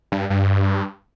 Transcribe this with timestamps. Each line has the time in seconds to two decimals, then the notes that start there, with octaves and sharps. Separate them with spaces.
0.12 G2
0.30 G2